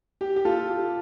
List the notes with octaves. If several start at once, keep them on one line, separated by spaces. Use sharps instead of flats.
G4
G4
F4 A4
G4